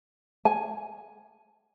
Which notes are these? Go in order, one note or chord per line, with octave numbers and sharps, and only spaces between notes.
G#5